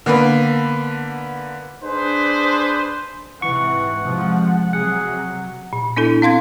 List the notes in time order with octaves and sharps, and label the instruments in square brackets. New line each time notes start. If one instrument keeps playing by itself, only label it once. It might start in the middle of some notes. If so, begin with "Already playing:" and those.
[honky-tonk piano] D3 A#3 B3 B4
[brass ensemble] D4 G#4 B4 C5
[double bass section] G#2 C3 E3 [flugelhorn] F#5 [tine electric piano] C#6
[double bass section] C3 F3 G#3
[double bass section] C3 F#3 [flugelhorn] G#4 [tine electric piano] F#5
[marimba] A#2
B3 D4 E4 A4
C4 F5 C6 G#6